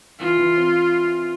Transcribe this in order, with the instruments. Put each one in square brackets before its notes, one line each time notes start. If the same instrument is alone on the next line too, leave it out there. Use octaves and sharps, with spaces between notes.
[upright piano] E3 [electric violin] F4
[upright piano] E3
C4